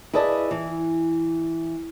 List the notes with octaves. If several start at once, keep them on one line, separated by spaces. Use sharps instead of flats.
E4 G#4 B4 D5 D#5 A5
E3